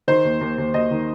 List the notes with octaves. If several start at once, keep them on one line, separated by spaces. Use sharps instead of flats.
D#3 C5
D#2
D#2
D#2
D#2 D#5
D#3